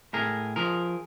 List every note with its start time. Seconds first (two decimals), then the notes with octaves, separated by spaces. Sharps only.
0.13 A2 G#4 A#4
0.56 F3 G#4 A#4